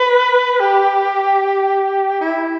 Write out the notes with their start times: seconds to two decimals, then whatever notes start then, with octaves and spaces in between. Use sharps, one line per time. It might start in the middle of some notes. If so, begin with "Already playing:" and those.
Already playing: B4
0.60 G4
2.21 E4